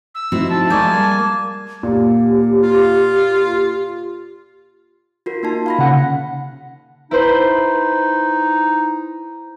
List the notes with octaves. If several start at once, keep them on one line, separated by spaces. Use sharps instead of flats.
E6
F3 A3 C4 D#4 E4 F#4
A5
G#3 A#3 D5 G#5 C6 C#6 G6
G3
A#2 G4
F4
F4 F#4 A#4
A#3 D#4 A5
F5 B5 A#6
C#3 F#5
D#4 E4 B4 C5